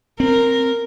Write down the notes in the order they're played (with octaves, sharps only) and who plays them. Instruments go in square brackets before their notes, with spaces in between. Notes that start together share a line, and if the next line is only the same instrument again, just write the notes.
[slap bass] C4 [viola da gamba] A#4